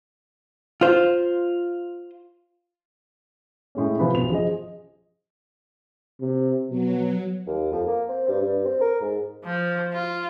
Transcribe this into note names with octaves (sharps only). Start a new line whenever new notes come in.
F4 C5
A2 G#3 C#4
C3 F3 F4 B4 B5
B1 F7
F3 G#4 D#5
C3
B2 F#3
D#2
F2
A#3
C4
G2
G2
C4
A#4
G#2
F3
F4